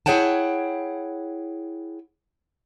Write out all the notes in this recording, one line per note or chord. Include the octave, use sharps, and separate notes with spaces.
E4 G#4 C#5 F#5 G5 A5